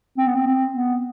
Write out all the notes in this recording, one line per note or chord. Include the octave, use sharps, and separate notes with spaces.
C4
B3
C4
C4
B3